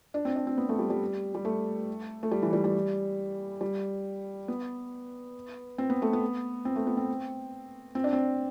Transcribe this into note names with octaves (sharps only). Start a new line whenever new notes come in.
D4
C4
D4
C4
B3
A3
G3
G3
G3
A3
A3
G3
E3
G3
G3
G3
B3
C4
B3
A3
B3
C4
A3
B3
C4
C4
D4
C4